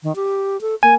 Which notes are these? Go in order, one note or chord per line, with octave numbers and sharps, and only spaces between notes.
D#3
G4
A4
A#3 G#5